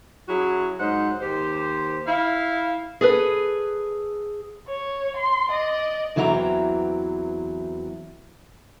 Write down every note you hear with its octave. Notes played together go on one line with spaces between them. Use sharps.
F#3 C#4 E4 F#4 G#4
G#2 F#3 D#4 C5 F#5
D#2 G4 C5
E4 F5
G#4 A4 B4
C#5
C6
D5 D#5
E2 E3 F#3 C4 E5 A#5